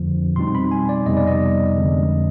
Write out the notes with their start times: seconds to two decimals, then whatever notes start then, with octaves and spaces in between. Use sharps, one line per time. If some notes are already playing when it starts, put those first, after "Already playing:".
Already playing: F2 D3 F3
0.36 B2 G3 C4 D#4 C6
0.55 B5
0.71 G#5
0.89 D5
1.06 F2 C3 G3 B3 D#4 D#5
1.17 D5
1.27 D#5
1.77 F2 D3 G#3